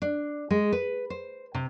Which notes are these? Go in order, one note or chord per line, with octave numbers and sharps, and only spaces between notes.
D4
G#3
B4
C5
C3